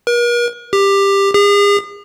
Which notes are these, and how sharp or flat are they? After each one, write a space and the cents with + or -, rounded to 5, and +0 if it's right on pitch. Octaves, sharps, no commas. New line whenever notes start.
A#4 +45
G4 +15
G#4 -40